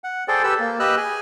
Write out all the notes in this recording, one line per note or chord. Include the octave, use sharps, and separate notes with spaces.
F#5
G#4 A4 C5 D5 G5
G4 A4 B4 E6
A#3
G4 B4 D#5 E6 F#6
G#4 G#5